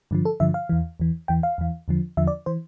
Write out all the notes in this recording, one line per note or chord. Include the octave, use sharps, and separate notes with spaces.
G2 D3 F3
A4
G2 D3 F3 E5
F5
E2 E3
E2 E3
E2 E3 G5
F5
E2 E3
E2 D3 F3
E2 D3 F3 E5
D5
E3 C5